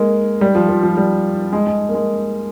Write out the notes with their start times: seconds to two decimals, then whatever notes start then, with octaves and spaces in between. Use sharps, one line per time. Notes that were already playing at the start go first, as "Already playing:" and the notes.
Already playing: G#3 A#3
0.41 G3
0.55 F3
0.69 F3
0.83 F3
0.97 G3
1.52 G#3
1.67 G#3
1.89 A#3
1.95 G#3